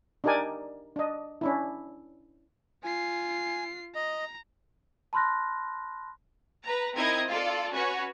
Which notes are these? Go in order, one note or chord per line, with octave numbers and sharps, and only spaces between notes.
D4 D#4 G4 A#4 D5 G#5
D4 D#5
C#4 D4 E4
F4 G#5 C7
D#5 A#5
A5 B5 C6 F6 F#6 A#6
B4 A#5
C4 D#4 E4 A#4 D#5 G#6
F4 A4 D5
C#4 F#4 B4 C#5